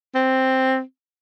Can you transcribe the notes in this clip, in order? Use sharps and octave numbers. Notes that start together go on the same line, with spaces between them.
C4